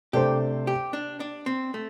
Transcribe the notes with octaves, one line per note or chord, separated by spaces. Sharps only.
C3 A3 D4 G4 A4 C5
G4
D4
D4
C4
A3